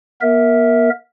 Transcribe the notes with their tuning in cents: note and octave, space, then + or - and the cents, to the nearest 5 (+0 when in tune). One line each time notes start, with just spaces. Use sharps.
B3 -45 A#4 +0 E5 -15